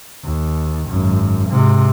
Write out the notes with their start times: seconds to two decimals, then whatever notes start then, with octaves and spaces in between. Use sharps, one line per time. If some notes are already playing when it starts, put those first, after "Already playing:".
0.24 D#2
0.89 G#1 F#2
1.49 G#2 C3